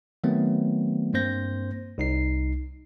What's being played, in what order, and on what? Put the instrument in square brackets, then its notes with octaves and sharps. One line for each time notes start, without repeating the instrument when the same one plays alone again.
[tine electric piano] D#3 F#3 A3 B3 C4
G2 A#3 C4 C5 G6 A#6
C2 D#4 C7